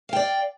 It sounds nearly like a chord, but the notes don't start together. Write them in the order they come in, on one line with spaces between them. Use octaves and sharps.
F5 G5 D5